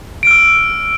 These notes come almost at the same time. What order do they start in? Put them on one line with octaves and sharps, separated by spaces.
D7 F6 E6